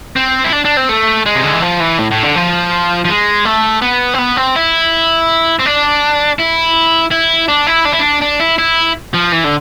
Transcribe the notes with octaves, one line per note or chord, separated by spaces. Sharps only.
C4
E4
D4
D4
C4
A3
G#3
C3
D3
E3
F3
E3
A2
A2
D3
F3
F3
G#3
A3
B3
C4
B3
C4
E4
C4
D4
E4
E4
D4
E4
D4
E4
D4
D4
E4
E4
F3
E3
D3